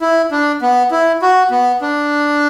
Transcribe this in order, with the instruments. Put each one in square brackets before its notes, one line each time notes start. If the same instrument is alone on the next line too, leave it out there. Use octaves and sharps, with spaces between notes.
[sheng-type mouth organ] E4
D4
B3
E4
F#4
B3
D4